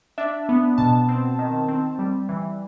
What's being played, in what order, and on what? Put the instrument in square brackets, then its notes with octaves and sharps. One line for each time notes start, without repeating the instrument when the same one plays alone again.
[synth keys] D4 E5
B3
B2 A5
C4
D#3
C4
G3
E3